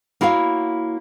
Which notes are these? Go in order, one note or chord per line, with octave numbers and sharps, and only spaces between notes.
A#3 E4 F#4 C#5 F5